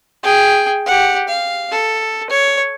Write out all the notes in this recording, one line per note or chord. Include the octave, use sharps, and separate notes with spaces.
G#4 G5
G4 F#5
F5
A4
C#5